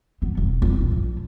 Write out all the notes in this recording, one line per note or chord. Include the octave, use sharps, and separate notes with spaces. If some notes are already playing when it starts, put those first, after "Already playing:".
B3
E1
E2
A#1
F3